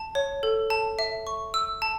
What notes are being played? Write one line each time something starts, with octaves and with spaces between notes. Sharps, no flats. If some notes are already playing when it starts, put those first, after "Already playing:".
Already playing: A5
C#5
A4
A5
E5
C#6
E6
A5